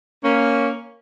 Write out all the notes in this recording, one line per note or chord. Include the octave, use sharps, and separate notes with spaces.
A#3 C#4